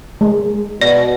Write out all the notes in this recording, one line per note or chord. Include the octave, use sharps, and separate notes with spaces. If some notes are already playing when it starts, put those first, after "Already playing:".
G#3
B2 D5